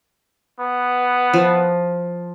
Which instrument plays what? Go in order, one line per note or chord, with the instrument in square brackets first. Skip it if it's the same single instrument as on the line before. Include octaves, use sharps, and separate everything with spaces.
[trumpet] B3
[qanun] F3